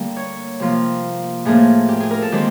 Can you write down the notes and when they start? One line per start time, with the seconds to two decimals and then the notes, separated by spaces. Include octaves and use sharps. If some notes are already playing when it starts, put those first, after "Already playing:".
Already playing: D3 G3 A#3
0.17 C#5
0.60 C3 F3 A#3
1.45 A2 F3 A#3 G#4
1.89 G4
2.00 G#4
2.11 A#4
2.22 A4
2.32 D#3 G#3 C4 G4